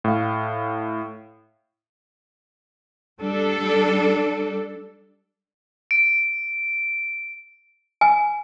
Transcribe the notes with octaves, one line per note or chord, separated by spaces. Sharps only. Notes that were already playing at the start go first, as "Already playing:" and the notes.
A2 F5
G3 D4 A4
D7
G#5